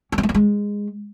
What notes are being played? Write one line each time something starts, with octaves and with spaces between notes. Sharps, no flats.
C#4
C4
A3
B3
G#3